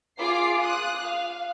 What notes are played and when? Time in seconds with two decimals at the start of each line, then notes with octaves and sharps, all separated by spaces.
0.20 F4 G#4 D6 C7
0.62 D#6 F#6
1.03 F5